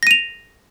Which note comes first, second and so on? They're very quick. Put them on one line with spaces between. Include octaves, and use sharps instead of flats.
A#6 D#7 F7